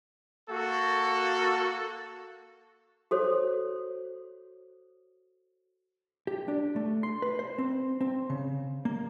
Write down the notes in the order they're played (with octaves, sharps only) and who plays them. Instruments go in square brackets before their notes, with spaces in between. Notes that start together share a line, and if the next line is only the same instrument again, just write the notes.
[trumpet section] A#3 F#4 A4
[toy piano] F#4 A4 C5 C#5
[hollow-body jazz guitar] G4
D4
A3
C6
B4
C5
C4
C4
C#3
A#3